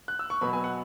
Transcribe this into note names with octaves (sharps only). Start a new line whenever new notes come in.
F#6
E6
C#6
B2 F#3 B3 B5
G#5
F#5